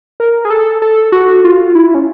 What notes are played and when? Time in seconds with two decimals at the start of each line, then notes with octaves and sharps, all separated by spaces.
0.20 A#4
0.45 G#4
0.50 A4
0.82 A4
1.12 F#4
1.44 F4
1.75 E4
1.95 C#4